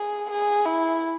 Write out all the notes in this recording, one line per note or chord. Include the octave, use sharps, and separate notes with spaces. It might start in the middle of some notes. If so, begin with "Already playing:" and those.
Already playing: G#4
G#4
E4